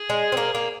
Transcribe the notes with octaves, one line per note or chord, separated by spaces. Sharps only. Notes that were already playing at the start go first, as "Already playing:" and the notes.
Already playing: G#4
G#3
C4
A#3
A#3